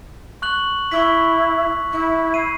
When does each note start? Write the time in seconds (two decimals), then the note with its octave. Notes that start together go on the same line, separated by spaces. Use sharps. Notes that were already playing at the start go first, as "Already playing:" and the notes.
0.42 C#6 F#6 F#7
0.91 E4 C#6 E6 B6
1.93 E4
2.34 C7 D#7